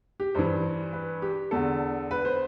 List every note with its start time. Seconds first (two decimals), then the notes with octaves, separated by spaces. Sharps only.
0.20 G4
0.35 G2 E3 C5
0.93 B4
1.22 G4
1.51 E2 D3 A4
2.11 B4
2.25 C5